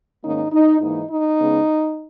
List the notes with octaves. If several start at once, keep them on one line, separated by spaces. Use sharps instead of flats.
G#2 D#3 A#3 C#4 D#4
D#4
G#2 E3 A#3 D#4
D#4
C#3 G#3 B3